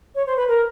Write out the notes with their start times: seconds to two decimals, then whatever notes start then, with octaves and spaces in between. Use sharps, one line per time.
0.15 C#5
0.27 C5
0.36 B4
0.48 A#4